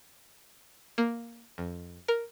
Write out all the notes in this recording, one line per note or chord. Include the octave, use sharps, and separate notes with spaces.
A#3
F2
A#4